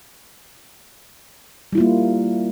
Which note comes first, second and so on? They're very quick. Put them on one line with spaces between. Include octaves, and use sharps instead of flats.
G3 E4 F4 A#3